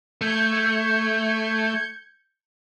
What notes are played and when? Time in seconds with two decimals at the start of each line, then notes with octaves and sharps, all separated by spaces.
0.21 A3 G6 G#6 C#7